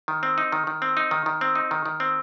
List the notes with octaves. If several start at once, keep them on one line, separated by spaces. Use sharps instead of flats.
D#3
C4
D#4
D#3
D#3
C4
D#4
D#3
D#3
C4
D#4
D#3
D#3
C4